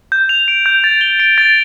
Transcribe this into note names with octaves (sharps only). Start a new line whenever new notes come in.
G6
F7
D7
G6
A6
G7
D7
A6